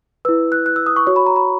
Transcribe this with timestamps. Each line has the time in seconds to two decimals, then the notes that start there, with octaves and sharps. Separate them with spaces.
0.25 E4 B4 E6
0.52 F#6
0.66 F#6
0.76 E6
0.86 D#6
0.96 C#6
1.07 F#4 C#5 C#6
1.16 B5
1.26 A#5
1.36 B5